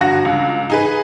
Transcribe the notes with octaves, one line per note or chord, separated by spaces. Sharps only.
G1 D3 F#4 A#6
C#2
D#4 G#4 B4